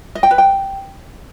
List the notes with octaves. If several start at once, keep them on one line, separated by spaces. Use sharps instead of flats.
D#5
G5
B4
G5